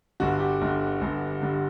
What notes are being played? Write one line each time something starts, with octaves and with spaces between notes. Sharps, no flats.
G1 G2 D3 F#4
G4
G1 G2 D3
G1 G2 D3
G2 D3